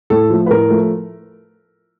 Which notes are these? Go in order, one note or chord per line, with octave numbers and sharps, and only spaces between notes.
A2 A4
F3 A3
B4
A2 A#4
F3 A3